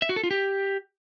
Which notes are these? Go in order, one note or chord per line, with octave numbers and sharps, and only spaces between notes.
E5
F#4
A4
F4
G4